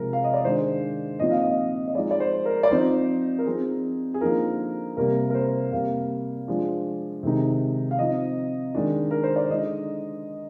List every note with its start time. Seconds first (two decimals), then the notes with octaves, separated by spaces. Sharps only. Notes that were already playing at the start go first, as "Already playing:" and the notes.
Already playing: C3 F3 G#3 A#4
0.13 F5
0.24 D#5
0.34 D5
0.45 D#3 G#3 D4 C5
1.20 A#2 F3 C4 D#4 D#5
1.31 F5
1.43 D#5
1.87 D#5
1.95 F3 G#3 D#4 D5
2.11 D5
2.20 C5
2.45 A#4
2.63 D5
2.71 F3 C4 D#4 C5
3.39 A#4
3.46 F3 C4 D#4 G#4
4.14 G#4
4.21 D3 F3 A#3 D#4 A#4
4.97 C3 G3 A#3 A#4
5.30 A#4
5.35 C5
5.72 C3 G3 A#3 F5
6.48 F3 G#3 D4
7.23 C3 D#3 G#3 D#4
7.91 F5
7.98 F3 C4 D#4 D#5
8.75 D#3 G#3 D4
9.11 A#4
9.24 C5
9.36 D5
9.50 D3 G#3 D#4 D#5